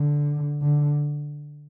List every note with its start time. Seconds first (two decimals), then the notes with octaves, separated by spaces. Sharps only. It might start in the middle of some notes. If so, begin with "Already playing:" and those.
Already playing: D3
0.62 D3